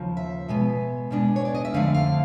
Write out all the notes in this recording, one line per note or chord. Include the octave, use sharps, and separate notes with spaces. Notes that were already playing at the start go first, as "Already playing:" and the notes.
Already playing: D#2 C#3 F3
E5
B2 G#3 B3
B2 G#3 B3 D4
C#5
D5
D#5
E5
F2 D3 F3 A3 F5
F5